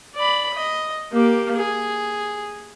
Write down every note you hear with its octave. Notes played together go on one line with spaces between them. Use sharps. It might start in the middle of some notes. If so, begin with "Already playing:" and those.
D5 B5
D#5
A#3 G4
G#4